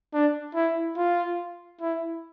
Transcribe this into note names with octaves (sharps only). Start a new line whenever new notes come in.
D4
E4
F4
E4